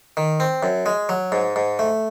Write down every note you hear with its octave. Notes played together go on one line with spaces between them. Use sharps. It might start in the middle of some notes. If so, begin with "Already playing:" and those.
D#3
C4
F#2
G#3
F#3
G#2
G#2
A3